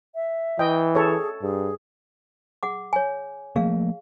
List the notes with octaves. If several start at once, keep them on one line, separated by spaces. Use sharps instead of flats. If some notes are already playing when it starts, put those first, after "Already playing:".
E5
E3 D#5 G5
G#4 A4 C#5
G2 G#4
G#4 F#5 D6
C#5 G#5
F3 A3 A#3 G#4 F5